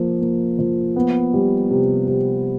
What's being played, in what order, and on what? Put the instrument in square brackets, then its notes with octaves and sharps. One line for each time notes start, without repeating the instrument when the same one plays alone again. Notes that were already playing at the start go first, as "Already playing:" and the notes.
Already playing: [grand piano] F3 A#3
A#3
F3
B3
G3
C3
C3